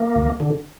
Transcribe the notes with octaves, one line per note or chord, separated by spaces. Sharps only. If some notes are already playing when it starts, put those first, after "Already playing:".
Already playing: A#3
D2
D3